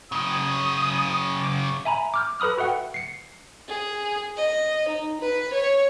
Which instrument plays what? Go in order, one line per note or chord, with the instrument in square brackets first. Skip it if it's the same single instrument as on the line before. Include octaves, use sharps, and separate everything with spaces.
[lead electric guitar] F#2 C#3 [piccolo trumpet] D#6
[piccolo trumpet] D6
[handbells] E5 G#5 A#5 B5
D6 F6 G6
A4 B4 B5 D#6 F6
F#4 B4 E5 F#5 G5
C7 C#7
[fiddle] G#4
D#5
D#4
B4
C#5